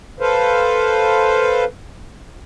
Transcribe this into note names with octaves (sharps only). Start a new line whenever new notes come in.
A4 B4 C5 F5